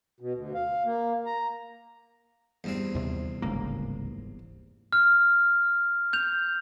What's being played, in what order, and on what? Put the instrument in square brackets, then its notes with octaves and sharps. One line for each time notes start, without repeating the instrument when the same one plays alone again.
[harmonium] B2
D2
F5
A#3
A#5
[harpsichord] E2 G2 C4
[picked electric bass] D#2 C3
[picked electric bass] D1 G1 A#3 [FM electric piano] C#2 G#2
[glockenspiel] F6
G6 F7